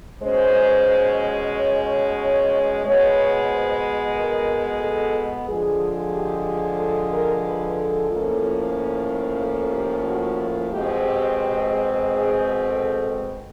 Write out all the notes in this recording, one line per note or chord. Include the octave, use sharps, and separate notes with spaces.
B2 G#3 C#4 C5
C#5
C#5
C#5
B2 G#3 B3 C#5
C5
A#4
A4
D3 F3 G#3 G#4
G4
G#4
A4
A#4
B4
A4
A2 F3 A#3 C#4
A4
G4
F#4
B2 G#3 C4 G4
G4
G4
G#4
G#4
A4